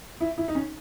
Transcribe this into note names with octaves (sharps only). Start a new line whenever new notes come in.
E4
E4
D#4
C#4